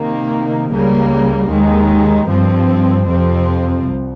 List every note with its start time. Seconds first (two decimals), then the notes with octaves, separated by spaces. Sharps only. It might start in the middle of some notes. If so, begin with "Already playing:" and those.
Already playing: C3 D#3 A#3
0.71 C#2 C#3 G3 A#3
1.49 D#2 D#3 G#3
2.27 G2 F3 C4
3.05 F2 C3 F3 C4
3.83 C2